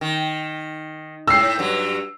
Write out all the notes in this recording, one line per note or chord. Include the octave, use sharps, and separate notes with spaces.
D#3
A2 E6 C7
G2 F#3